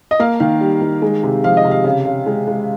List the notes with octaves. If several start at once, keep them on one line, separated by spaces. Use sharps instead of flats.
D#5
A#3 F5
D#3 F5
G3
D#3
G#3
C3
F3 F5
D#5
C3
F5
C#3
C#3
G#3
G#3